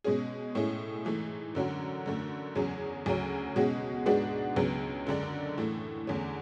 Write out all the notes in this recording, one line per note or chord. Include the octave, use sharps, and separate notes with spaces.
B2 G#3 C#4 G#4
A2 G#3 C#4 E4 G#4
G#2 E3 A3
F#2 D3 F#3 C#4 F#4
F#2 D3 A3
E2 C#3 F#3 C#4 G#4
D2 C#3 F#3 C#4
B2 G#3 C#4 F#4
G#2 G#3 B3 D4 F#4
C#2 C#3 F#3 B3
F#2 D3 G#3 D4
A2 E3 A3
E2 D3 A3 C#4